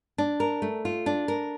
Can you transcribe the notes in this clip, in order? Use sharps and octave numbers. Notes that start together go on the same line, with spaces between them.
D4
A#4
A3
F4
D4
A#4